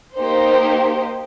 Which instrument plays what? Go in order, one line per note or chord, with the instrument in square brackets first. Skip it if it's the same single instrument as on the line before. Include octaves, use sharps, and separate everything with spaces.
[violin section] A#3 D#4 G4 C5